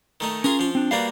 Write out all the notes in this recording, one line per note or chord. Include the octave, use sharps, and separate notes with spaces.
D#3 A3 D#4
C#4 F4 G#4 A#4
F3 F4
C4 D4
G3 A#3 F#4 B4 D5 F5